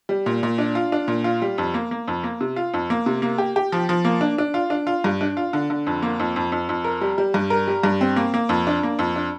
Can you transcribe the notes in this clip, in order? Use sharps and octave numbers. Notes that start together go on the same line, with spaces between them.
G3
A#2
A#2
D4
F4
D4
A#2
F4
G3
F2
A#3
A#3
F2
A#3
C3
F4
F2
A#3
C3
A#3
G4
G4
F3
F3
A#3
D4
D4
F4
D4
F4
G2
D4
F4
D3
D3
F2
A#3
F2
F2
F2
F2
A#4
G3
G3
G2
A#4
G3
G2
C4
A#3
A#3
F2
D4
A#3
F2
D4